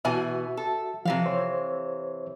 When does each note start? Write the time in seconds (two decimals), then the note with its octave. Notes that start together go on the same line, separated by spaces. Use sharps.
0.05 B2 E3 F#4 E5 G#5
0.57 A4
1.05 C3 E3 F3 F5
1.26 C5 C#5